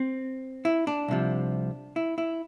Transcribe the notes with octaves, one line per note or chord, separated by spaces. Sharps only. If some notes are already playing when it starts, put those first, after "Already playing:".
Already playing: C4
E4
D4
C2 C3 F3
E4
E4